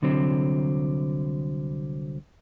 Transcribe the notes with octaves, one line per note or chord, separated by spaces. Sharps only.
C2 D3 F#3 C4